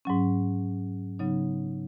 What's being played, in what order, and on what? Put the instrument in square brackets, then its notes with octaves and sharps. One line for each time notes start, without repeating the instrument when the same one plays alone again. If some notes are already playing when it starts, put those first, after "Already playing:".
[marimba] G#2 F#3 C#4
C#3 F#3 B3 D#4